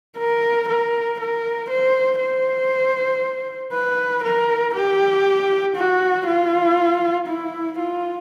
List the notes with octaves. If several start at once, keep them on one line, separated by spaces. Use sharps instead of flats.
A#4
A#4
A#4
C5
C5
B4
A#4
G4
F#4
F4
E4
F4